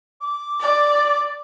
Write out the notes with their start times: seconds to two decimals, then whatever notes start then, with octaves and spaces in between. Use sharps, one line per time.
0.21 D6
0.60 D5